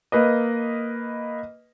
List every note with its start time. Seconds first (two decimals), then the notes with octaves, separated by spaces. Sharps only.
0.12 A#3 B4 D#5